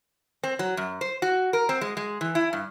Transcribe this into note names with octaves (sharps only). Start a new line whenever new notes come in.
C4
F#3
F#2
C5
F#4
A#4
C4
G#3
G#3
E3
E4
G2